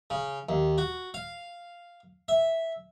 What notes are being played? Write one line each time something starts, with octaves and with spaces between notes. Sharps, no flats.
C#3
D#2
F#4
F5
E5